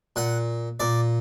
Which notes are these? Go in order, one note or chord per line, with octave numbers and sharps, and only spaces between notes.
A#2 F#5
A#2 D5